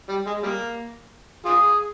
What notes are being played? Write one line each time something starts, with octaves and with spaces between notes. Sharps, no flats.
G3
G#3
G3 A#3
F4 G#4